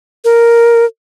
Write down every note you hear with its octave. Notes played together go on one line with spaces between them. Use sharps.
A#4